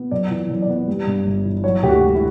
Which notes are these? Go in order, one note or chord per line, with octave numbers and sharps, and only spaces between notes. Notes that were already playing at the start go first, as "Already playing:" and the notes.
Already playing: B3
F#2 D5
E3
F#2
D5
B3
G3
G2
G1
E3
F#3 C#5
D2 G4
F#4
E1
E4